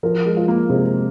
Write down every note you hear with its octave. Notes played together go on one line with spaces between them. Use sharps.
F3 A#4
G#3
F4
A#3
C3 G#3